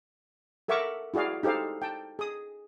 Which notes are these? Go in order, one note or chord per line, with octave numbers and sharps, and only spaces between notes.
A4 A#4 E5 F#5 C#6 D6
E4 F#4 G#4 D5 F5
D#4 G4 A4 C5 F5
G5 A5
G#4 D#6